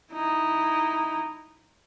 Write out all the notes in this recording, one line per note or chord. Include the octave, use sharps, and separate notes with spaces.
D#4 E4